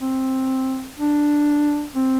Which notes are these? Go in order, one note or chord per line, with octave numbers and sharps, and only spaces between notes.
C4
D4
C4